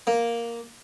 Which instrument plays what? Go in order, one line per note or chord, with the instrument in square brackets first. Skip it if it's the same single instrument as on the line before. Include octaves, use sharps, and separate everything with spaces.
[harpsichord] A#3